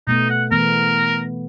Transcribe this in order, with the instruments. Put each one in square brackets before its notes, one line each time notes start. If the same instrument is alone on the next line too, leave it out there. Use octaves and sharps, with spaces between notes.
[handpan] B2 A3 B3 [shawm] D#4
[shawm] F#5
[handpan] E3 A3 B3 [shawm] A#4